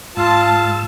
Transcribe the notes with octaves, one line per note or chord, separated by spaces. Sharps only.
G#2 F4 A5 E6